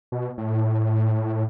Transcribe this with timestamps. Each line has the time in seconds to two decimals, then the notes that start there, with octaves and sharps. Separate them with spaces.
0.12 B2
0.38 A2